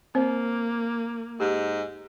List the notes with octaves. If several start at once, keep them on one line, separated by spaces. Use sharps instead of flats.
A#3 C4 C5
G#2 G4